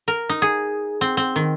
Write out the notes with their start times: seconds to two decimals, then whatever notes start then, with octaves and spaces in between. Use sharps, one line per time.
0.08 A#4
0.29 D#4
0.42 G#4
1.01 C4
1.17 C4
1.36 D#3